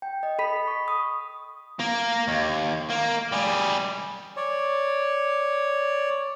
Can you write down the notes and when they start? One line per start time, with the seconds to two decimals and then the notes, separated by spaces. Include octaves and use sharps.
0.02 G5
0.23 D#5
0.39 A4 B5 B6
0.67 C#6
0.88 D#6
1.80 A#3
2.28 D#2
2.90 A#3
3.32 G3 G#4
4.37 C#5 D5